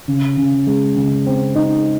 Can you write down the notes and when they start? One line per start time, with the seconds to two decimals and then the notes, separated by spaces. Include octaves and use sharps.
0.08 C#3
0.37 C#3
0.67 G#3
0.96 C#3
1.26 C4
1.55 D#4